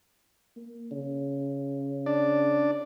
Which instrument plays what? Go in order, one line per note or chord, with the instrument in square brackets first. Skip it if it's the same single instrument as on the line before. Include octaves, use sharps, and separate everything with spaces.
[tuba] A#3
C#3
[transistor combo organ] D4 D5